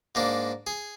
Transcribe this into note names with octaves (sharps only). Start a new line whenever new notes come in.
G#2 A#3 D4
G#4